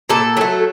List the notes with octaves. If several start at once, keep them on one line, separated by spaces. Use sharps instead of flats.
A#2 A4
F#3 A3